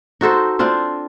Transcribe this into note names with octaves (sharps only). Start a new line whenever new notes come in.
D#4 F#4 A4 C5
C4 D4 F4 C5